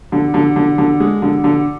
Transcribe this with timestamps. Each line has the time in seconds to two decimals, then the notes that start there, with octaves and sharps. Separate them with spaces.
0.12 D3
0.34 D3
0.56 D3
0.78 D3
1.00 G#3
1.22 D3
1.44 D3